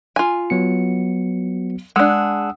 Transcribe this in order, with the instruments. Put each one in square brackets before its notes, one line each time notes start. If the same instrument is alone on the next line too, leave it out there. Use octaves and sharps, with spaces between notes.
[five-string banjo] F4 G#5
[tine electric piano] F#3 B3 C#7
[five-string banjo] G#3 D4 [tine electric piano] F#5 D#6 E6